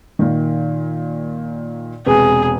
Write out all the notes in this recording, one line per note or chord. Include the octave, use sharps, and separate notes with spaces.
A#2 D#3
E1 C3 G#4 B4